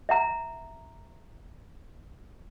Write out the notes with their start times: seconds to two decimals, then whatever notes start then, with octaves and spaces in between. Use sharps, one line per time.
0.09 E5 F#5 A#5